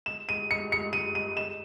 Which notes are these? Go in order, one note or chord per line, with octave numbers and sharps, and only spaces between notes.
E7
D#7
C#7
C#7
D#7
D#7
E7